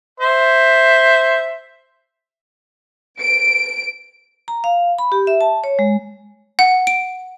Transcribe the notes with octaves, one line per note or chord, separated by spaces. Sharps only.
C5 E5
D7
A#5
F5
B5
G4
E5
A5
C#5
G#3
F#5
D7